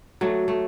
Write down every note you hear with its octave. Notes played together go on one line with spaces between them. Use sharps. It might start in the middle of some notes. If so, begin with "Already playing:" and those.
F#3 A3
A3